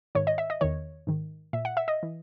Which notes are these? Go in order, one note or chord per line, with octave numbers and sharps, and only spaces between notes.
G#2 D#3 C#5
D#5
E5
D#5
E2 D#3 C#5
G#2 D#3
A#2 E5
F#5
E5
D#5
E3